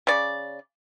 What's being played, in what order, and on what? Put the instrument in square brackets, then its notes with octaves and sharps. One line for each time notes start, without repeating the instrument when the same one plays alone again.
[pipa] C#3 D5